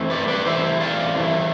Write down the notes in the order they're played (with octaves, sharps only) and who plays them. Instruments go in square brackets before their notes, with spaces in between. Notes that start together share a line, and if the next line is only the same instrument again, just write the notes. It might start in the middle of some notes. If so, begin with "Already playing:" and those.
Already playing: [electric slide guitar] E3 A3 C4 E4
B4 D5
B4 D5
E3 A3 C4 E4 C5 E5
D5 F5
E3 A3 C4 E4